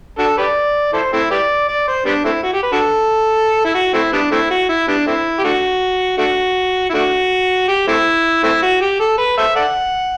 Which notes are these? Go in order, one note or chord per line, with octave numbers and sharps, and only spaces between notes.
D4 F#4 A4
G4 B4 D5
E4 A4 C5
A3 C4 E4
G4 B4 D5
D5
C5
G3 B3 D4
A3 C4 E4
F#4
G4
B4
D4 F#4 A4
E4
F#4
A3 C4 E4
G3 B3 D4
A3 C4 E4
F#4
E4
G3 B3 D4
A3 C4 E4
G4
A3 D4 F#4
A3 D4 F#4
E4
A3 D4 F#4
G4
A3 C4 E4
A3 C4 E4
F#4
G4
A4
B4
A4 C5 E5
A4 D5 F#5